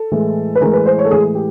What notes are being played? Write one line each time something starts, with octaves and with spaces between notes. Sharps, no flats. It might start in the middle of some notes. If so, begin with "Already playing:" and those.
Already playing: A4
A2 E3 G#3
B4
A2 E3 G#3 A#4
B4
C5
C#5
A4
A2 E3 G#3 G#4
G#4
G4